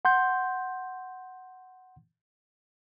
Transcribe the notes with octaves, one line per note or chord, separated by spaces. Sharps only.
F#5 C6 G6